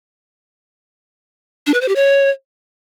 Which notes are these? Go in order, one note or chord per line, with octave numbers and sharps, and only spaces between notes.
D4
B4
C5
G4
C#5